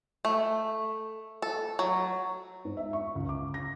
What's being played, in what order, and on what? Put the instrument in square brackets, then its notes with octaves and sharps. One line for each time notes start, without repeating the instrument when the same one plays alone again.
[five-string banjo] A3
A4
F#3
[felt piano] G#2
E5
C#6
C#2
D6
A#6